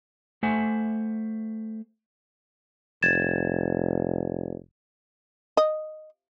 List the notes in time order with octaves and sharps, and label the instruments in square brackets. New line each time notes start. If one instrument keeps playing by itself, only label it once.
[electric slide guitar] A3 C5 E5 F#5 G#5
[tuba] F1 [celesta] G#6 A6 E7
[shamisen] D#5